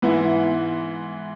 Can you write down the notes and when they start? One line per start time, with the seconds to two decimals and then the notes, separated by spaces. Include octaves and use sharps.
0.02 G#2 E3 B3 E4